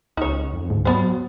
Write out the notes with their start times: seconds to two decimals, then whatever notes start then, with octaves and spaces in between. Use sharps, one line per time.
0.17 C#2 D#4 C#5
0.53 F2
0.70 D2 G#2
0.85 F#3 B3 C5